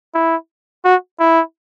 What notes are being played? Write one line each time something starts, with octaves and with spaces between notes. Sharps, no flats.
E4
F#4
E4